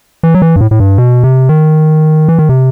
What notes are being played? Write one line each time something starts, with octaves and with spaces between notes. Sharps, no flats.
E3
F#3
E3
G2
A2
A2
G2
B2
C3
D#3
E3
D#3
C3